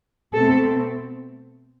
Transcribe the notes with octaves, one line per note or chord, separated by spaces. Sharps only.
B2 A3 C4 A4